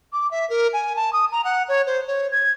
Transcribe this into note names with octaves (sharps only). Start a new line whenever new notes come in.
D6
E5
A#4
G#5
A5
D#6
A#5
F#5
C#5
C5
C#5
G#6